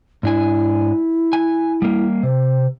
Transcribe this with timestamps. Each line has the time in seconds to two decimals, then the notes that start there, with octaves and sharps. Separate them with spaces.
0.23 G#2 D4 E4 G#5
1.33 G#5
1.82 G3 A#3
2.23 C3 C5